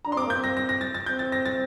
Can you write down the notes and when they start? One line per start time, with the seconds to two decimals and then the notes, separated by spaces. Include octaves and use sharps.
0.05 D4 A#5
0.12 C6
0.15 C4 D6
0.26 A#3 G6
0.36 C4
0.44 A#6
0.57 A#6
0.69 A#6
0.81 A6
0.95 A6
1.06 C4 G6
1.19 A6
1.32 A#6
1.46 A6